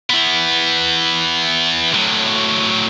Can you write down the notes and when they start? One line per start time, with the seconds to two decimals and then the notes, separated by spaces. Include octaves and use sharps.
0.10 E3 B3
1.94 A2 F#3